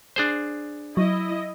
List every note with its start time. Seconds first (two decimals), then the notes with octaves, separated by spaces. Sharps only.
0.16 D4 G#4 C5
0.97 F#3 E4 D#5